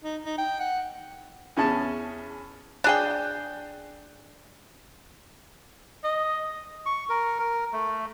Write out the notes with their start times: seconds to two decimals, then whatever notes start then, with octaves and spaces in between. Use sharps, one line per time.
0.04 D#4
0.24 D#4
0.38 G5
0.60 F#5
1.57 E2 C#4 G#4 A5
2.84 D4 G#4 G5
6.04 D#5
6.86 C#6
7.09 A#4
7.39 A#4
7.73 A3